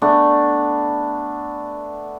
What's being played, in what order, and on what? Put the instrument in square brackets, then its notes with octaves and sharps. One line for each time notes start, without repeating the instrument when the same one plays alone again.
[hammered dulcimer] A3 B3 D4